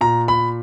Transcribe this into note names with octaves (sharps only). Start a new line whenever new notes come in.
A#2 A#5
B5